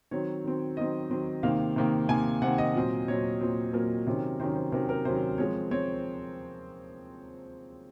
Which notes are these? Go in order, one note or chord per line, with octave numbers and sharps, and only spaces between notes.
D#3 F#3 C4 C#5
D#3 F#3 C4
D#3 F#3 C4 D#5
D#3 F#3 C4
C3 D#3 A#3 F5
C3 D#3 A#3
C3 D#3 A#3 G#5
C3 D#3 A#3 F#5
D#5
A#2 F#3 C4
A#2 F#3 C4 C#5
A#2 F#3 C4
A#2 F#3 C4 A#4
C3 D#3 F#3 C#4
C3 D#3 F#3 C#4 C5
C5
C3 D#3 F#3 C#4 A#4
A#4
C3 D#3 F#3 C#4 C5
F3 G#3 C4 C#5
C4 C#5